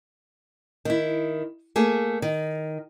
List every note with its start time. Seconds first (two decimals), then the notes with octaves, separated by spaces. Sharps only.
0.85 D#3 E4
1.76 A3 A#3 G#4
2.22 D#3